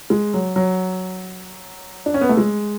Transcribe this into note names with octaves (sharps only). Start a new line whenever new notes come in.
G#3
F#3
F#3
D4
C#4
B3
A3
G#3